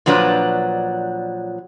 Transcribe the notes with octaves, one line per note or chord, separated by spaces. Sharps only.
A#2 F3 F#3 D4 B4